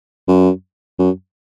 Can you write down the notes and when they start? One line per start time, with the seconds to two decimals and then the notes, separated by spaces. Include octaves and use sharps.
0.28 F#2
0.99 F#2